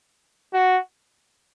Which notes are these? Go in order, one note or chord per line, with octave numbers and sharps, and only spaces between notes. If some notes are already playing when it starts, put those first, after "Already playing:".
F#4